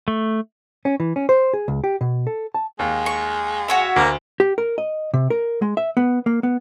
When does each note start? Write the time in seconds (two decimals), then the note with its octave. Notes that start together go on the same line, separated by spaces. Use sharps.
0.08 A3
0.85 C#4
1.00 E3
1.16 C#4
1.29 C5
1.54 G#4
1.68 C#2
1.84 G4
2.01 B2
2.27 A4
2.54 A5
2.79 D#2 G#3
3.06 C#6
3.68 F#4 C#5 E5
3.96 D2 A#3
4.40 G4
4.58 A#4
4.78 D#5
5.14 C3
5.30 A#4
5.62 G#3
5.77 E5
5.97 B3
6.26 A#3
6.43 B3